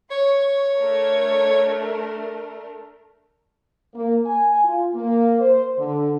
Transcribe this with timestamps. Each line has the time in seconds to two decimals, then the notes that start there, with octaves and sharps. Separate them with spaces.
0.11 C#5 C#6
0.76 A3 D4 A#4
3.95 A#3
4.26 G#5
4.64 F4
4.95 A#3
5.39 C5
5.78 D3